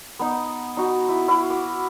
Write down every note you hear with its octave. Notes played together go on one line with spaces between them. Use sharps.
B3 D#4
D#4 F#4
E4
E4 F#4 F5
D6